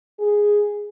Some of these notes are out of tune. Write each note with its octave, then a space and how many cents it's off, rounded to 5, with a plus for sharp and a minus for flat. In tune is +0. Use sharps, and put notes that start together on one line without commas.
G#4 -5